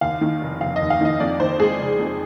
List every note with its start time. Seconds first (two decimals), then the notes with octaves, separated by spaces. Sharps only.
0.01 D#2 F5
0.21 D#3
0.41 F1
0.61 F1 F5
0.76 D#2 D#5
0.90 F5
1.01 D#3 D#5
1.20 F2 D5
1.40 D#3 C5
1.60 G#3 G#4
1.80 F1
1.99 F2